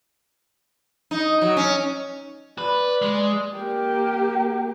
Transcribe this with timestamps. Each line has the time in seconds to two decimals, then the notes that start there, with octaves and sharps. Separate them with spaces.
1.11 D#4
1.41 F#3
1.57 C#4
2.58 B4 D5
3.02 G#3
3.57 A#3 G4